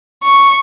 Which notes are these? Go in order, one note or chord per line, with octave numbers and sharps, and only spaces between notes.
C#6